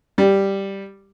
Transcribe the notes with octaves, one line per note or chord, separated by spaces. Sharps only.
G3